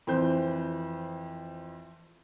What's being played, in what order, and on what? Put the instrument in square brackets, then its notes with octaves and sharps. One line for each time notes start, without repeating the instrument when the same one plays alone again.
[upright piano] F2 E3 C5 G6